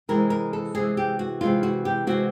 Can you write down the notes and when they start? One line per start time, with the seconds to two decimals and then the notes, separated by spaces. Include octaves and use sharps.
0.09 C3 E3 G#3 A#4
0.30 A#4
0.53 A4
0.75 C3 E3 G#3 G#4
0.97 G4
1.19 F#4
1.41 C3 E3 G#3 F4
1.63 F#4
1.85 G4
2.07 C3 E3 G#3 F#4